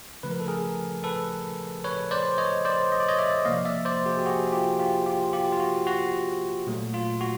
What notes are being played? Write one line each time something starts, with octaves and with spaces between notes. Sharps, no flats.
C#3 F3 A3 B4
A#4
A4
G#4 A#4
A4 B4
B4 C#5
C5 D5
C#5 D#5
C5 D5
D#5
D5
C#5 D#5
D5 E5
C3 F3 A#3 D#5 F5
D5 E5
C5 D5
F#4 G#4
G4
F#4 G#4
F4 G4
F4 G4
F4 G4
F4 G4
F4
F#4
F#4
A#2 F#3 A3
F4
F#4